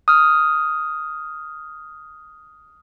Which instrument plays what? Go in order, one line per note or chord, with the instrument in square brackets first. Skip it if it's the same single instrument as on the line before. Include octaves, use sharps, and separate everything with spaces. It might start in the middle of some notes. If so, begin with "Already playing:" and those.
[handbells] D#6 F6